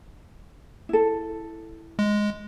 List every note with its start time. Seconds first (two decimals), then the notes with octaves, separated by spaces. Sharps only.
0.89 E4 A4
1.99 G#3